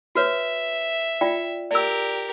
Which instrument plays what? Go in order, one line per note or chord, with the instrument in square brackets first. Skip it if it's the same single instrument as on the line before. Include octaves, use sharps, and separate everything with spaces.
[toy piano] F#4 B4 C#5 [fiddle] E5
[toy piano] F4 D5 G5
[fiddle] G4 A#4 [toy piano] D5 E6